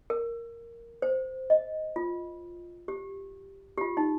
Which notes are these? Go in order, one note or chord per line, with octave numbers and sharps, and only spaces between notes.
A#4
C5
D#5
F4
G4
G4
F4
D#4